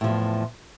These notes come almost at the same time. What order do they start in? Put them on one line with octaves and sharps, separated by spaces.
A2 F3 E2